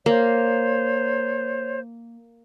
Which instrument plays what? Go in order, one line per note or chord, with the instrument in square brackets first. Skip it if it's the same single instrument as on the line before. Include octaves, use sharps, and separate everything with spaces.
[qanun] A#3 [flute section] C5 C#5